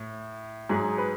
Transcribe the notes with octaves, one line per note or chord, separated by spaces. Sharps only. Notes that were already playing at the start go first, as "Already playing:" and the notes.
Already playing: A2
G#2 F#3 G#4
B4